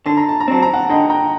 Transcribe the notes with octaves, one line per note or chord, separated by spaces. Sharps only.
D3 A5
A#5
A5
A#5
F#3 C4 A5
A#5
F#5 A5
D3 D#5 G5
G5 A#5